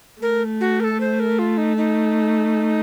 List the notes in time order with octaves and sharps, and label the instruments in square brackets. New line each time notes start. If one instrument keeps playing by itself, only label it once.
[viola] A3 [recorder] A#4
[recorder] F#4
A#4
A4
C5
A#4
F4
D#4
D#4